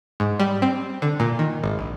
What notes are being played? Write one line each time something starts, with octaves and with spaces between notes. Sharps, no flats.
G#2
G3
C4
D3
A#2
D#3
G#1
A#1